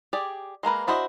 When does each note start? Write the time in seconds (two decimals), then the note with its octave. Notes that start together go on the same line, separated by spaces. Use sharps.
0.13 G4 G#4 D5
0.63 G#3 A#3 A#4 B4
0.87 D4 E4 F#4 C5 D#5